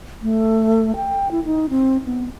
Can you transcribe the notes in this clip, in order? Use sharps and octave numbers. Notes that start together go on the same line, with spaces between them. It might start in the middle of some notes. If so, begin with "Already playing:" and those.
A3
G5
E4
D#4
C4
B3